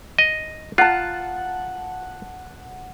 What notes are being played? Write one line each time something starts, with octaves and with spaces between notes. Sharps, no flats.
D#5
F4 F#5 A5